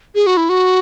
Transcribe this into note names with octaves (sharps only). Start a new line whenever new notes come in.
G#4
F#4
E4
F#4